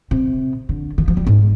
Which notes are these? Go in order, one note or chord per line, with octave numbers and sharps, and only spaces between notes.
C3
D3
D#3
F3
G3
G#2